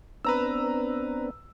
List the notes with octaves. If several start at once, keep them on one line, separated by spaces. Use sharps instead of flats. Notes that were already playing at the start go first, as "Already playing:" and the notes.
B3 C4 D4 B4 A#5 E6